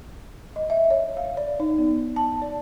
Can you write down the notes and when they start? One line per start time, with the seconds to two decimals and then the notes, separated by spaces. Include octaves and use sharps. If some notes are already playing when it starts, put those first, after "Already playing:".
0.56 D#5
0.70 E5
0.90 C#5
1.17 F5
1.37 D5
1.60 D#4
1.79 B3
2.16 A5
2.42 D5